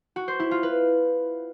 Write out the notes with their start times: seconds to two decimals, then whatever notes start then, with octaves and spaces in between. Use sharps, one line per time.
0.16 F#4
0.28 C5
0.40 E4
0.51 F4
0.63 B4